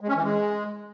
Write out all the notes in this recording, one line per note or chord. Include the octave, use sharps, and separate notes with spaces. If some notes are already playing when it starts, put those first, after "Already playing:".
G#3
C#4
E3
G#3